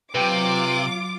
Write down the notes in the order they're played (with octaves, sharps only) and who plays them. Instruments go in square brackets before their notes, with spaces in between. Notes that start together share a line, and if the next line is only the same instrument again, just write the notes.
[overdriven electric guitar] C3 [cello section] F#3 [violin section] F4 D6 [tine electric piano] B4 G5